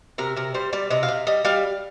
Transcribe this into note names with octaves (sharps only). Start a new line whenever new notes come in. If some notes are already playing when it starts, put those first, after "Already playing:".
C3 A#4
C3 A#4
G3 C5
G3 D5
C3 D#5
F5
C3
G3 D#5
G3 F5